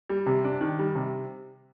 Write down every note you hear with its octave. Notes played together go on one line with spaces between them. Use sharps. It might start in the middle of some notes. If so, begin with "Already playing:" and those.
G3
C3
D4
D#3
G3
C3